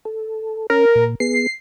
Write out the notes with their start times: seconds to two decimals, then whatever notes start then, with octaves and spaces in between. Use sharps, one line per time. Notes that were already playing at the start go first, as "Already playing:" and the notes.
0.05 A4
0.70 C#4 A#4
0.95 A#2
1.20 B3 G#4 C7